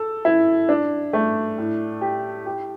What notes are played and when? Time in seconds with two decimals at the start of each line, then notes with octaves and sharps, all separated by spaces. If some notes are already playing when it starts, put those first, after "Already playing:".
Already playing: A4
0.25 E4
0.69 D4
1.13 A3
1.58 A2
2.01 G4
2.46 G4